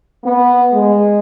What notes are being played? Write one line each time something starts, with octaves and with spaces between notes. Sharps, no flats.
B3
G#3